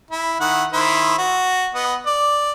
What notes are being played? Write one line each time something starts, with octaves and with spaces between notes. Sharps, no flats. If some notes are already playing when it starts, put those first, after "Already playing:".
E4
D#3 E4 F#5
D#3 E4 C5
F#4
B3 D#5
D5